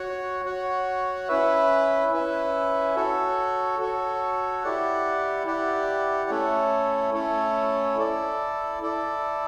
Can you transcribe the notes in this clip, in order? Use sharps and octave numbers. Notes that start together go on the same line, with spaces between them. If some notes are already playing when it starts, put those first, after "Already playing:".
Already playing: F#4 C#5 F#5
F#4 C#5 F#5
C#4 E4 B4 E5
C#4 E4 B4 E5
F#4 A4 C#5
F#4 A4 C#5
E4 G4 D5 F#5
E4 G4 D5 F#5
A3 C#4 E4 A4 C#5
A3 C#4 E4 A4 C#5
E4 A4 D5
E4 A4 D5